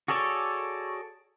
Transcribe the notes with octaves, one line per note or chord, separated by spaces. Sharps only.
F#4 G#4 A4 C#5 D5